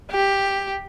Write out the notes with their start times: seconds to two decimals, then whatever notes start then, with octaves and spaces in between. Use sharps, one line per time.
0.11 G4